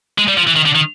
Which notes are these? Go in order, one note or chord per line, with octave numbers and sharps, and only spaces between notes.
G#3
G3
F3
E3
D#3
D3
D#3